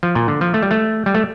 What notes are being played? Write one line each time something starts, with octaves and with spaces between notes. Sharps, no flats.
F3
A#2
D3
F3
A3
G3
A3
G3
A3